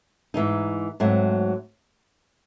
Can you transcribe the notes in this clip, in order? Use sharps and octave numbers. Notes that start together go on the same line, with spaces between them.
G#2 E3 G#3 D#4
G#2 F#3 A3 C4